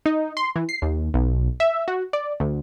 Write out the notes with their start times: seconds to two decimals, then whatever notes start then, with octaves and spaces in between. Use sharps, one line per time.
0.06 D#4
0.37 C6
0.56 E3
0.69 C7
0.82 D#2
1.14 B1
1.60 E5
1.88 F#4
2.13 D5
2.40 D2